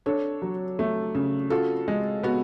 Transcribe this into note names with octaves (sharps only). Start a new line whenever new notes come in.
D4 A4 C#5
F#3
A3
C#3
F4 F#4 A4
G#3
B3 F#4